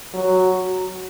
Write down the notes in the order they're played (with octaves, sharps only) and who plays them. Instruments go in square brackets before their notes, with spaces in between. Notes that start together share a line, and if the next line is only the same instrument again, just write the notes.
[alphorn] F#3